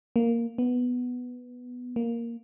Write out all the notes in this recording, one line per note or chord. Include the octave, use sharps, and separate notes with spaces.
A#3
B3
A#3